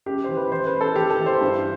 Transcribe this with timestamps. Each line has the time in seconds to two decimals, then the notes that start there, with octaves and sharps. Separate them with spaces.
0.06 F#2 G4
0.24 E3 C5
0.36 B4
0.52 E3 C5
0.66 B4
0.74 F#2
0.81 A4
0.96 E3 G4
1.10 A4
1.19 E3
1.26 C5
1.41 G2